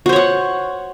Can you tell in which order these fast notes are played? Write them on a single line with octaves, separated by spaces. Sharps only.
F#4 C5 C#5 F#5